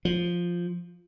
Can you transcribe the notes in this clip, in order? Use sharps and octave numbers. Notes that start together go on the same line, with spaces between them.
F3